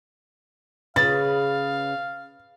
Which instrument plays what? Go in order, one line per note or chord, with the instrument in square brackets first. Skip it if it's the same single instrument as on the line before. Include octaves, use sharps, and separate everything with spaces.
[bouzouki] C#3 B4 [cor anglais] F5 [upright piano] A6